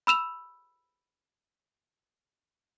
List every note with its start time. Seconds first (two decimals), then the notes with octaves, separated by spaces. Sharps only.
0.07 B5 E6 E7 F7